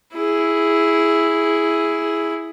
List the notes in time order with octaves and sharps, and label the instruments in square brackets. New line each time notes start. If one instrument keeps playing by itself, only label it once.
[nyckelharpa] E4 G#4